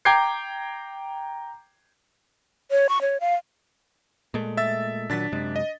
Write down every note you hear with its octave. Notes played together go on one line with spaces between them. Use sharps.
G5 A#5 D6 G6 G#6 C7
C#5
C#6
C#5
F5
A#2 G#3 A3
E5 E6 A6
A#2 D#3 F#3 D4 A6 B6
F#2 C3 G#3
D#5